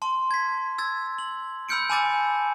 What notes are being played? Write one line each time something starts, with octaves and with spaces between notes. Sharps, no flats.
A5 C6
G#6 B6
E6 G#6 A6
F#7
B5 E6 F6 G6 C#7 D7
G#5 A5 B5 D6 E6 A6